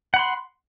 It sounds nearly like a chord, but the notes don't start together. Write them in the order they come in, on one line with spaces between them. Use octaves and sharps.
F#5 B5 C6